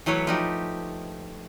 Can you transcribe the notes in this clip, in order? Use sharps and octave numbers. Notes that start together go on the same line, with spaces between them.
E3 F#3 A3 B4 C#5
F3 D#4 G4